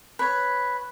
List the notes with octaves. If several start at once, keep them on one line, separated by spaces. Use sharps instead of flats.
B4 C#5